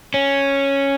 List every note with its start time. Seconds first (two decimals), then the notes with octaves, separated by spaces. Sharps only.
0.14 C#4